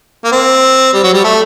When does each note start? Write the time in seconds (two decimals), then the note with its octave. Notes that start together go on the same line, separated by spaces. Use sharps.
0.24 A#3
0.32 C4
0.94 G3
1.04 F#3
1.14 G3
1.24 A3